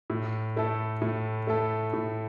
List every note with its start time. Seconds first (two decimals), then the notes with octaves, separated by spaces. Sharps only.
0.10 A2
0.56 A3 E4 A4
1.02 A2
1.47 A3 E4 A4
1.93 A2